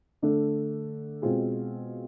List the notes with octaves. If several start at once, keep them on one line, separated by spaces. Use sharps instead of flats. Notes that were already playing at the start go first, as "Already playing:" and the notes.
D3 A3 D4 A4
B2 G#3 C4 F4 G#4